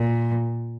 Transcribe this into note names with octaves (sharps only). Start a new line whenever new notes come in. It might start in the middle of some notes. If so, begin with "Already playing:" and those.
Already playing: A#2